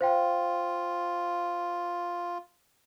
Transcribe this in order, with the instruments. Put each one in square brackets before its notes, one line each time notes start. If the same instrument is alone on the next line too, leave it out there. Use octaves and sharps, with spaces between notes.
[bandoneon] F4 [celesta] C5 F5 G5